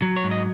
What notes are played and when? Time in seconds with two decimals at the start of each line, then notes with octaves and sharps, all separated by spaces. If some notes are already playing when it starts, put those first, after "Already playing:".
0.02 F#3
0.17 C#5
0.24 G#2
0.31 D#5